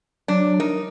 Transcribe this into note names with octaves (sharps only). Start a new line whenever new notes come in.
F#3 D4
D#4 A#4